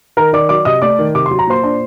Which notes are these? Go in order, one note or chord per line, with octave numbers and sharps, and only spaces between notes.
D#3 A#4 A#5
D#3 D5 D6
F#3 D5 D6
C3 D#5 D#6
A3 D5 D6
D#3
C3 D6
C6
F#3
A#5
A#2 C5 C6
D4